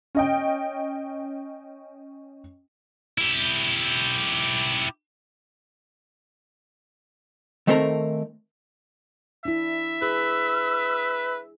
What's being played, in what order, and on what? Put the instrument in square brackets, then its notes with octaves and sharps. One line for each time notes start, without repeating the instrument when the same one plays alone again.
[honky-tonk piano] C#4 D#5 G5
[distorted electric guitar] E4 G4
[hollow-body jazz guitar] D#3 A3 C4 A4 A#4 A#5
[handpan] D4 E4 [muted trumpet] E5
[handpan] G#4 [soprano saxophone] B4 [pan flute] E6